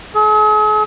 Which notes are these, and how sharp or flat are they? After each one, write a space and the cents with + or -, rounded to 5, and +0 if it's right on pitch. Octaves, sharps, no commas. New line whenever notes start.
G#4 +45